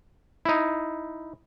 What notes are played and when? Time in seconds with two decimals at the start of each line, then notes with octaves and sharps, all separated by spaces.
0.45 D#4 E4